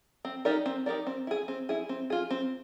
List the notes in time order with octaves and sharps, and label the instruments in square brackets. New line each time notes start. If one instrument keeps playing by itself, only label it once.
[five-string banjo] C4
D#4 G4 A#4 D5
C4
D#4 G4 A#4 D5
C4
E4 G#4
C4
E4 G#4
C4
F4 G#4
C4